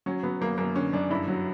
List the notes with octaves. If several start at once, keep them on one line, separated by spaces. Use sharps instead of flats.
F#3 C#4
F#3 B3
F#2 A#3
F#2 A#3
D3 C#4
F#2 D4
G2 E4
F#3